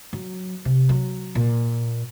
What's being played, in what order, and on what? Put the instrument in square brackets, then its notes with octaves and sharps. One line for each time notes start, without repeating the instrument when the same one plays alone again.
[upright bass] F#3
C3
F#3
A#2